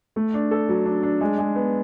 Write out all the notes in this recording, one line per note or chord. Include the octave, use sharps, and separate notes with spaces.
A3
D4
A4
F#3
D4
D4
G#3
G#3
B3